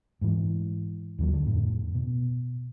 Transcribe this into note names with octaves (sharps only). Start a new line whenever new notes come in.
G#2 E3
D#2 D#3 F#3
D3
F2 A2
B2